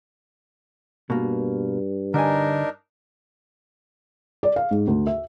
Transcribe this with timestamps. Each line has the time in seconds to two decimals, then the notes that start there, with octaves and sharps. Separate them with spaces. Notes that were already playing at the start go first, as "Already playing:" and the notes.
1.10 G2 B2 A#3
2.14 D3 D4 D#4 A#4 G#5
4.43 D5
4.56 F5
4.71 G#2
4.87 D2
5.07 E5